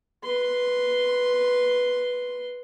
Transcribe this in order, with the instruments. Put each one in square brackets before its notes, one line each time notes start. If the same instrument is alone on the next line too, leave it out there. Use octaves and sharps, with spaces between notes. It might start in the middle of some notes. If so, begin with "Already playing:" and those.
[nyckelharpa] B4 C6